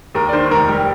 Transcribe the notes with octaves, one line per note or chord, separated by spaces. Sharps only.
D#2 A#4
D5
D#3 C5
F1 A#4
G3 G4